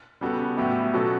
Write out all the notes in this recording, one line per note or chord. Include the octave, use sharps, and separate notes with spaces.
C#3 G3 B3 F#4 A4
A2 F#3 B3 E4 G4
B2 F#3 C#4 F#4 A4